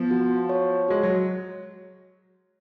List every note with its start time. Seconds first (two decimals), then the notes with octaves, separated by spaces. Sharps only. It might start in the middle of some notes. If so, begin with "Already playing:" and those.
Already playing: F3 B3
0.11 F#4
0.49 C#5
0.88 G#3 F#4
1.03 F#3